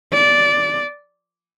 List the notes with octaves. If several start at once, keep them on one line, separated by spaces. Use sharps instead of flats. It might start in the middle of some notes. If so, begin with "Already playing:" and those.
D5